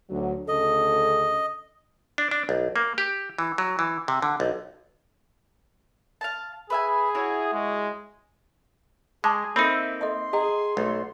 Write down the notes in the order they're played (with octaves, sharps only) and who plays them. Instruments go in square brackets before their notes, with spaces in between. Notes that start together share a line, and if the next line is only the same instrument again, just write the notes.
[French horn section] D2 F#3
[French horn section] D2 C#3 A4 [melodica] D#5
[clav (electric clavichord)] D4
D4
B1
A#3
G4
E3
F#3
E3
C3
D3
B1
[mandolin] F5 A5
[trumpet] G#4 [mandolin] B4 E5 G#5
[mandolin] E4 F#4 C#5
[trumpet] G#3
[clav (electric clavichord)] G#3 [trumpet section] G#4 [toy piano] A5 C#6 D6
[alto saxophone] A#3 [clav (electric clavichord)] C4 D#4 [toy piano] A4 C5 B5 [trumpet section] E5
[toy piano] A4 D#5 E5 [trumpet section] C6
[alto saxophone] G#4 [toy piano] D#5 G5 A#5
[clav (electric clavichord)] B1 [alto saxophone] A3